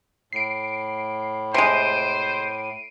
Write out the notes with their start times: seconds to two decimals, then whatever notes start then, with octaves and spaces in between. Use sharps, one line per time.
0.33 A2 C7 D7
1.54 C3 G#3 C5 C7 D7 D#7